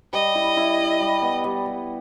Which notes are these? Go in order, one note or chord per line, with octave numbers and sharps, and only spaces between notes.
G3 D#5
E4
E4
E4
G3
B3
G3
G3